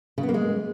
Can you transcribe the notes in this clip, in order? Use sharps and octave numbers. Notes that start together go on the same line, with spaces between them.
C#3
B3
A#3
G#3